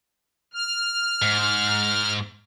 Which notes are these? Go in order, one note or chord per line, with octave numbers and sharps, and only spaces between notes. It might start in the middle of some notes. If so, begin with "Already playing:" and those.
F6
G#2